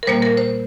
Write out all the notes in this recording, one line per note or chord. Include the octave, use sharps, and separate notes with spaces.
A#4
A#2 G3 A#3 C5
A#4
C5